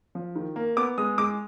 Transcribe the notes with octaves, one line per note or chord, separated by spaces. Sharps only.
F3
D#3
A#3
B3 D6
G#3 D#6
G#3 D6